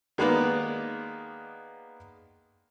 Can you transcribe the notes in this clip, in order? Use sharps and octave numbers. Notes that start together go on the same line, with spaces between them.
D#3 G#3 A#3 B3 B4 D5